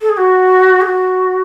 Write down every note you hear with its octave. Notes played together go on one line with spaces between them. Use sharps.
A4
G#4
F#4
G#4
F#4